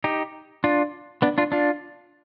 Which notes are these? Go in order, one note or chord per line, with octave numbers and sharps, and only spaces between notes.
D#4 G4
D4 F4
B3 D4
D4 F4
D4 F4